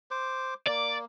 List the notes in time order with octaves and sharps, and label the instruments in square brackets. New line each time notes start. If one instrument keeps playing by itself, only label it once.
[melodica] C5 D6
[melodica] A#3 [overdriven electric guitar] D5